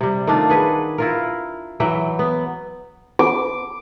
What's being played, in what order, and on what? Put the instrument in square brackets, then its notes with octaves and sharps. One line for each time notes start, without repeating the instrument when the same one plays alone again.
[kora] C3 G3
D#3 A3 D4 F4
F#4 G#4 B4
E4 F4 A#4
E3 F#3 E5 G5
B3
[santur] D6